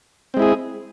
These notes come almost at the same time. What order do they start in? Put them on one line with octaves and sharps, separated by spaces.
C4 G#3 E4 G#4